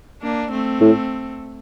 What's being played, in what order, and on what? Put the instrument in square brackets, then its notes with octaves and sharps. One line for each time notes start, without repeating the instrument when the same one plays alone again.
[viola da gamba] A#3 D4
A3 C4
[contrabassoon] A2